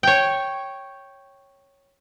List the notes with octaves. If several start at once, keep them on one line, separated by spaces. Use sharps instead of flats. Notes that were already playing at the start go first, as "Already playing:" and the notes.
C#5 G5